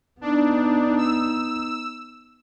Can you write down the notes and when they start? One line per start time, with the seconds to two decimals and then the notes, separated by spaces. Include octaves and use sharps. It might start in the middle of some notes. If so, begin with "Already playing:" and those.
0.21 B3 D4 D#4
0.98 E6